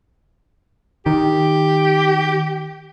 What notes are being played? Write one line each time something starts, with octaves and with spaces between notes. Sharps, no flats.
D#3 G4